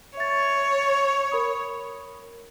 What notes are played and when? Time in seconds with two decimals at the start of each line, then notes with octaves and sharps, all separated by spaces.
0.17 C#5 E5 A6
1.31 A#4 B5 D#6